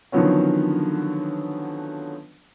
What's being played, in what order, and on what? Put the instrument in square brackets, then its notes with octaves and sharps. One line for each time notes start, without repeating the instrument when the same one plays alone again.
[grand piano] D3 D#3 F3 F#3 B3 C#4